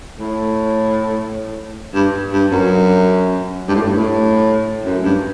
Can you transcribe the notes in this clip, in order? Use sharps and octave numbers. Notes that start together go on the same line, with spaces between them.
A2
G2
G2
F#2
G2
A2
G2
A2
F#2
G2